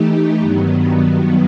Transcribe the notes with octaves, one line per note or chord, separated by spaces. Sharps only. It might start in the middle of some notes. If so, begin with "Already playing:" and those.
Already playing: E3 A3 D#4 G4
G2 D#3 F#3 B3